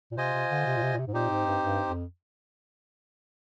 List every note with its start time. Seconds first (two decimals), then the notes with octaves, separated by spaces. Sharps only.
0.11 A#2
0.17 C3 F4 C5 D#5 G#5
0.33 C3
0.50 D3
0.66 C3
0.77 A#2
0.82 C3
0.94 A#2
0.99 C3
1.07 G#2
1.14 A#2 C4 D#4 G4 C5
1.30 G#2
1.46 G2
1.63 G2
1.88 F2